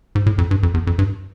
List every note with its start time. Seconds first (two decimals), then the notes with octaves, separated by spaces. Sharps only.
0.15 G#2
0.26 A2
0.38 F2
0.51 G2
0.63 F2
0.74 E2
0.87 F2
0.99 G2